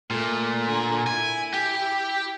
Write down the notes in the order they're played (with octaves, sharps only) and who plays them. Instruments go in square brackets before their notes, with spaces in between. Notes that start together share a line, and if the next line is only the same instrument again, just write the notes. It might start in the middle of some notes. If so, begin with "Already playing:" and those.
[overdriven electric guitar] A#2 [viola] A3
[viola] D3 G#5
[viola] E4 [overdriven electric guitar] G#5
[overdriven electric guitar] G4